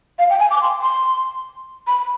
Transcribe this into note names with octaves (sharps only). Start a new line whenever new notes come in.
F5
G5
G#5
D6
C6
C6
B5